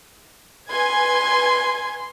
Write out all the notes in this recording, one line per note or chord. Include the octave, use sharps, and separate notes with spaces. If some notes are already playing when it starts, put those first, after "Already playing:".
B4 G#5 C6 G#6